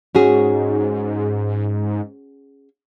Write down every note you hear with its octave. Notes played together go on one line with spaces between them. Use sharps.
G#2 C#4 F#4 G#4